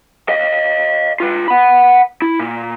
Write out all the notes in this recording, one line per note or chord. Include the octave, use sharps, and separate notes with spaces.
D#5 F5
F4 B4
F#5 B5
E4
A#2